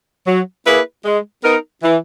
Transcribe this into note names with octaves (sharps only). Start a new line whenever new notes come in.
F#3
A#3 E4 G#4 B4
G#3
B3 D#4 A#4
E3